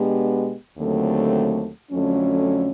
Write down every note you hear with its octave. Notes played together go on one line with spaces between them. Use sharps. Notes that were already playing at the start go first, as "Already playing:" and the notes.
Already playing: B2 G#3 B3 D4 G4
D#2 D3 F#3 A3 C4
F2 D3 F#3 A3 C#4